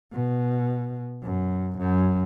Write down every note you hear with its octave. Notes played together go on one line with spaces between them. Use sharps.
B2
F#2
F#2